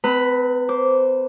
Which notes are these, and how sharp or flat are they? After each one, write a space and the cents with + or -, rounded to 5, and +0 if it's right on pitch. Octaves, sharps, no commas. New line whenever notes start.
C4 -40 B4 +0 A#5 -40
C5 +0 D6 -15